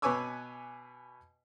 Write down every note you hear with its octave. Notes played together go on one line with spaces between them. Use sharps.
B2 B4 C#5 G#5 D6 E6